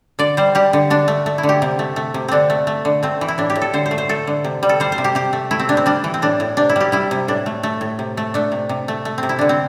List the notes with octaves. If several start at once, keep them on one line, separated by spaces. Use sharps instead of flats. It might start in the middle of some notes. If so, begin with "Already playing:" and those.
D3 D5
G3 C5
G3 G4
D3
D3 D4
A3
A3
E4
D3
G4
C3
A3
A3
C3
D3 C4 D4
A3
A3
D3
A3 C4
E3
E4
A2 D4
G4
A2
A4
D3 C5
C5
A3
C5
A3 A4
D3
C3
G3
A4
G3 C5
C5
C3
G4
C3 G4
A3
A3 E4
C4
C3 D4
C4
G3 D4
E3
C4
A2 D4
A2
C3 D4
E4
G3 G4
G3 E4
C3
A2 D4
A3
A3
A2
C3
A3
A3 D4
C3
C3
A3
A3
C4
C3
E4
D3 D4
C4